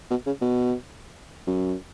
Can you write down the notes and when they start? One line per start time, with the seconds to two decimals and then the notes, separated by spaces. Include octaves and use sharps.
0.11 B2
0.26 C#3
0.41 B2
1.47 F#2